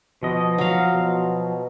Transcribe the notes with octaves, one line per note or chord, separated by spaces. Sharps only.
B2 F3 D#5
F#3 F5
B2